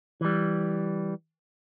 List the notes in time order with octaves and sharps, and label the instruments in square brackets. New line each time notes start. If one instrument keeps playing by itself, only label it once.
[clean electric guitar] E3 G3